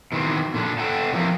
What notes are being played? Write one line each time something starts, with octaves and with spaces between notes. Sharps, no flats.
B2 D#3 E3 C4
A#2 D3 D4
A4 D5 F#5 G5 A5
C3 E3 F3 G#3 A#3 C4